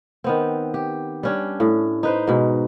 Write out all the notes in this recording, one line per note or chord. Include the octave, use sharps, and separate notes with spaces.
D#3 B3 C4
G4
G3 C#4 D4
A2
D#4 B4 C5
G#2 B2